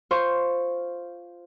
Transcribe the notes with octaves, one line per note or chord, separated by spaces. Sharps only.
F4 C5 C6 C#6